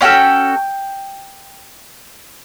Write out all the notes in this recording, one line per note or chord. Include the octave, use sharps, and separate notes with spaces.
C#4 F#4 A4 G5